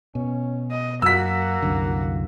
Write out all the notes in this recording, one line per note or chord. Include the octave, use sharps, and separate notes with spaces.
B2 C#4
D#5
F#2 A#3 F#4 E6 B6
C2 F#2 D3